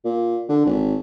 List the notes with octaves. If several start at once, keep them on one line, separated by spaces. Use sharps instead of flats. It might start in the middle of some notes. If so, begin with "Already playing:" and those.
A#2
D3
G#1